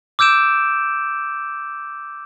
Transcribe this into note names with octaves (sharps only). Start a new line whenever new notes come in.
D6 E6 G6 D7 E7